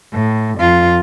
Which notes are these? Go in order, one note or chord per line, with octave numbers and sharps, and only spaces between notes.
A2
F2 F4